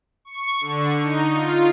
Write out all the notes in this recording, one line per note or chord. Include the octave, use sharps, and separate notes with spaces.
C#6
D3
D#4
F4